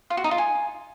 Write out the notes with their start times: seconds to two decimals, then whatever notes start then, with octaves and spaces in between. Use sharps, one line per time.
0.10 F4
0.17 F#4
0.24 D#4
0.31 F4
0.38 G#5